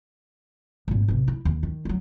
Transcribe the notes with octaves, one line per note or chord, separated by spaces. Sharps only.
G#1 A#2
A1 C3
E4
D#2
D#3
F#3 G#3